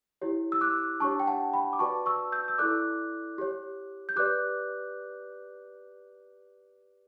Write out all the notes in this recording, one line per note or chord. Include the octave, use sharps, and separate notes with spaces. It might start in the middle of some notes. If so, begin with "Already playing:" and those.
E4 G4 C#5
E6
D6 F#6
D4 G4 C#5 A5 C#6
G5
F#5 A5
G5 B5
D6
F#4 B4 D5 A5 C#6
C#6 E6
E6 G6
E6
E4 A4 D5 D6 F#6
G4 C#5
G6
G4 B4 D5 D6 F#6